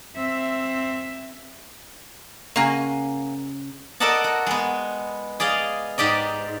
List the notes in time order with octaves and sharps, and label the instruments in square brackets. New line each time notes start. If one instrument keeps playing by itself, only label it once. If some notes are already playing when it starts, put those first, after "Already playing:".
[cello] C4 E5
[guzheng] C#3 F#4 [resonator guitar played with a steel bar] A#3 G#5
[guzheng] A4 A#4 D5 D#5 F#5 A5
F#4
G#3 B3
G#4 D5 D#5 F5
G#2 G4 D5 D#5